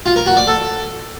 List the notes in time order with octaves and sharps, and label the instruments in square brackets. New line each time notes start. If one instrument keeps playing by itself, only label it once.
[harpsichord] F4
A#4
F#4
D5
A4